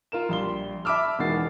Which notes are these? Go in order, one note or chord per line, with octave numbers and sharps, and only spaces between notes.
F4 A#4 E7
A#1 G3 C6 G7
E5 A5 B5 D6 E6 F6
E1 D#3 G#3 F#4 A6 C7